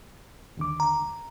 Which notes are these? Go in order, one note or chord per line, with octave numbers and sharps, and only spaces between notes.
D#2 D3 D6
A#5